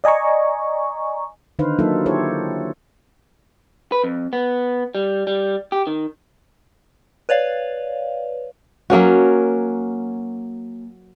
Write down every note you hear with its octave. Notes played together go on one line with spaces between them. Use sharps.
D5 D#5 G#5 A#5 C#6
D3 D#3 D#4 B4 C5 F5
F#3 A#3 D#4 F4 A4 E5
E4 G4 A4 C5 C#5
B4
F2
B3
G3
G3
G4
D#3
B4 C#5 D5 F5
F#3 A#3 C#4 F#4